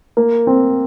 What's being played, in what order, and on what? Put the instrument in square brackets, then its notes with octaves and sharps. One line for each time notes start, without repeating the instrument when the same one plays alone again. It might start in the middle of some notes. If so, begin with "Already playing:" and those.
[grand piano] A#3
C4